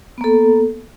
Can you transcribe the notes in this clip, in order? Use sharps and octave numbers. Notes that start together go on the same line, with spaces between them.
A#3 B3 A4